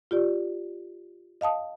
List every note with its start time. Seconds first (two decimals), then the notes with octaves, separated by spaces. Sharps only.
0.11 F4 G4 D5
1.41 D#5 F5 A5 D#6